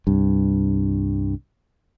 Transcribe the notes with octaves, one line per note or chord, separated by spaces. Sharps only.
C2 G2